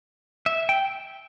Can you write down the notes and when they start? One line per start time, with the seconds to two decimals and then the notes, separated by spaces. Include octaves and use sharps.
0.46 E5
0.69 G5